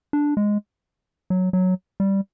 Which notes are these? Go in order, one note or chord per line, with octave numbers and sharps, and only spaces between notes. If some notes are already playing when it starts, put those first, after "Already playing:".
D4
G#3
F#3
F#3
G3